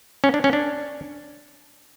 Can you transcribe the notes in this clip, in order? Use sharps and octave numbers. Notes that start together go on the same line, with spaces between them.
C#4
D4
C#4
D4